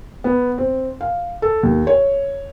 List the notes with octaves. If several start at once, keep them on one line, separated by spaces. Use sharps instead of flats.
B3
C4
F5
A4
D#2
C#5